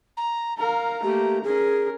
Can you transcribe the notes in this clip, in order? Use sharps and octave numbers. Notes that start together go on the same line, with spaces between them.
A#5
A#4 F5 A#5
A3 A#3 G4
C#4 G#4 A#4